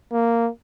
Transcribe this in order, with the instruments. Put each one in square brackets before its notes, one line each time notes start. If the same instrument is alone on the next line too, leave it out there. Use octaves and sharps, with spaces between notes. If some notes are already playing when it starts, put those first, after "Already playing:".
[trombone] A#3